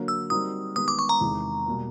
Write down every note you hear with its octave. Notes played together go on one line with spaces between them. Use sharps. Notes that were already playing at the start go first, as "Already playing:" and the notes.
Already playing: D3 F#3 A#3
E6
G3 C4 D#4 F#4 A#4 D#6
D#3 G#3 B3 D#4 G4 D#6
D6
C#6
A#5
E2 C3 D#3 G#3
B2 G3 A#3